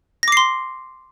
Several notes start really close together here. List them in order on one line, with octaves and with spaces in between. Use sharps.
A#6 D6 C7 C6